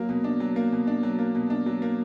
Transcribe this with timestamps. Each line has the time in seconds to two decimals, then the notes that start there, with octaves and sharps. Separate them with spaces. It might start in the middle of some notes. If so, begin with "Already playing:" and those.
Already playing: F#3 A#3
0.09 B2
0.24 D4
0.40 F#3
0.56 A#3
0.72 B2
0.87 D4
1.03 F#3
1.19 A#3
1.35 B2
1.50 D4
1.66 F#3
1.82 A#3